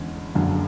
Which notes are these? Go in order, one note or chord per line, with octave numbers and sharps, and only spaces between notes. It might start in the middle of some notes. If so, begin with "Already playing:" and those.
Already playing: E2 D3 G#3 C#4
F#1 F#2 D3 F#3